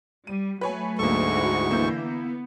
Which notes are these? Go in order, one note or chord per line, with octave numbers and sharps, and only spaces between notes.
G3 D#7
F#3 A3 B4 C#5 G#5
D2 G#2 A#3 A4 C#6
E4 F#4
D3 E3 A3 A#3 E4 G6
B3